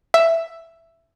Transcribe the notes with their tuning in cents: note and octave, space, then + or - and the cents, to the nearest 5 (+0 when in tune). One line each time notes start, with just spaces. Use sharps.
E5 +10